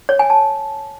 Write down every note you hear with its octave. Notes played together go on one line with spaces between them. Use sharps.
C#5
G#5
A5